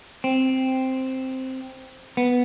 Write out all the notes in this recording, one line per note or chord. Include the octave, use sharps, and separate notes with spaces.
C4
B3